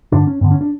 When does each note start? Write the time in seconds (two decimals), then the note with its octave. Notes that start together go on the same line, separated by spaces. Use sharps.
0.12 G2 D3 D4
0.27 C#4
0.41 G2 D3 B3
0.51 C#4
0.61 D4